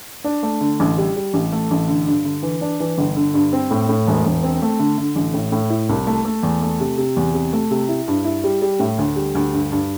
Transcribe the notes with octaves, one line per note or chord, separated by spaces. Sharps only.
D4
A3
D3
A1
G3
G3
A1
A3
A1
D3
G2
D3
E3
D4
E3
G1
D3
G2
C4
A2
A2
E1
E1
C4
A3
D3
D3
A1
A2
A2
E4
C2
A3
A3
E2
A3
C3
C3
E2
C3
A3
C3
E4
G2
E4
G3
G3
A2
D2
G3
D2
G2
G2